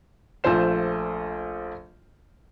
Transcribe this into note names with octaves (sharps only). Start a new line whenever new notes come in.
A#1 A3 F4 C5 E7